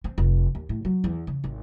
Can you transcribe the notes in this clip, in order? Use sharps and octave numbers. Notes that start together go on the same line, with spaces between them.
C4
F1
D#2
A2
F#3
E2
C#3
G#1